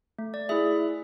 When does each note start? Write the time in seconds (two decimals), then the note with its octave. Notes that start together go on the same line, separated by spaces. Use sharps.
0.19 A3
0.34 D5
0.49 E4 G#4 E5